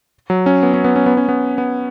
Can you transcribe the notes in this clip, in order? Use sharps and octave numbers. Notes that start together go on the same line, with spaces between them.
F#3
C#4
B3
C#4
B3
C#4
B3
C#4
B3
B3